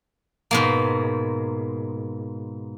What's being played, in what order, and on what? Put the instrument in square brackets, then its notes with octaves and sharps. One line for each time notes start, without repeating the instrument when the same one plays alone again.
[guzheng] G#2 B2 A#3